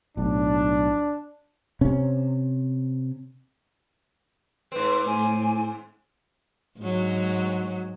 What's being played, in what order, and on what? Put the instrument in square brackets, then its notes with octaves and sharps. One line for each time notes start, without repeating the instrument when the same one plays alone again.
[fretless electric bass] B1 A2 [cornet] D4
[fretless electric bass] C3 C#4
[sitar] G#2 C4 [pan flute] B4
[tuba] A2 [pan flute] G#5
[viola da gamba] G#2 F#3